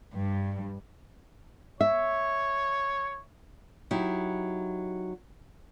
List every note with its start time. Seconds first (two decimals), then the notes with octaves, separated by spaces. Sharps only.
0.14 G2
1.81 C#5 E5
3.91 F#3 D#4 E4 G4